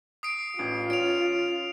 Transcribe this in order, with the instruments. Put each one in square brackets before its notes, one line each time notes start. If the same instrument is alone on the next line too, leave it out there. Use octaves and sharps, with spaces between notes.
[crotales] D#6 C7 D7
[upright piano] A1 [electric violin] F4
[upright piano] C#4 [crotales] D7 F7